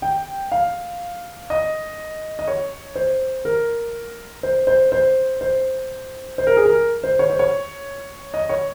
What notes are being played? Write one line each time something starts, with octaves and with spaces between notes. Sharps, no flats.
G5
F5
D#5
D#5
C#5
C5
A#4
C5
C5
C5
C5
C5
A#4
G#4
A#4
C5
C#5
C5
C#5
D#5
C#5